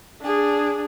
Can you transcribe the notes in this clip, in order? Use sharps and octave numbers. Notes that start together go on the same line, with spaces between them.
D4 G#4